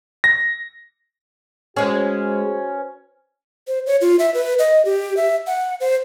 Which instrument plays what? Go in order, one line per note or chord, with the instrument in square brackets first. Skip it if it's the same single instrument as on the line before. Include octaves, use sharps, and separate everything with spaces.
[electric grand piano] A#6
[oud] G#3 G#4 [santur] C#4 [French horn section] F#4 B4 C5
[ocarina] C5
C#5
F4
E5
B4
D#5
G4
E5
F#5
C5